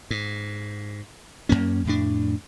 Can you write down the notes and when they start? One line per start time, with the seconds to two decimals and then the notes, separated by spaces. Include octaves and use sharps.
0.11 G#2
1.49 F#2 A2 A#3 C#4
1.85 F2 A2 D4